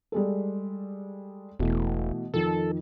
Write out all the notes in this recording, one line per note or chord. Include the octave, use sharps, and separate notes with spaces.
G3 G#3 A4
E1 B2 E3 A3
F2 D#3 D#4 A4